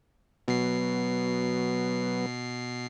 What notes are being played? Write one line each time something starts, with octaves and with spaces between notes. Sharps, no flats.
B2 F#3 B3 C7